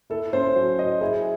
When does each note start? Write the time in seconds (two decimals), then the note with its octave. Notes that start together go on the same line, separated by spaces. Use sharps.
0.10 E4 A4
0.33 C#4 C5
0.55 F#3
0.78 F#3 D#5
1.01 E4 G#4